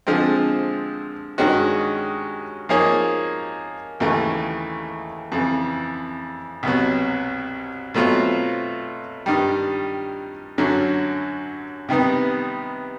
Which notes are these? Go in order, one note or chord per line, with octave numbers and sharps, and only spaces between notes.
D3 F3 G#3 C4
G2 D#3 G#3 C#4 F#4
F3 A#3 D#4 G#4 C#5
D#2 C#3 E3 A3
F2 C#3 E3
C2 B2 F#3
B2 F#3 A3 C4 F4
G2 D#3 G3
F#2 D3 F#3
C3 D#3 G3 B3